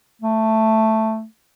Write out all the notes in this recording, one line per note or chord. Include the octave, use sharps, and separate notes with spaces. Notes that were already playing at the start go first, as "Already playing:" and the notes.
A3